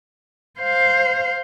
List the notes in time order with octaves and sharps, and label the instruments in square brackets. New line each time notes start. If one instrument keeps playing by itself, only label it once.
[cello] C5 F5